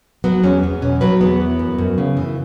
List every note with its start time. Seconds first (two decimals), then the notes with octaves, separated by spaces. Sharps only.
0.24 F#3 B3
0.43 E2 C#4
0.63 E2
0.82 B2 C#4
1.01 F#3 B4
1.21 E2 B3
1.40 E3
1.59 F#2
1.78 F#2
1.98 C#3
2.17 E3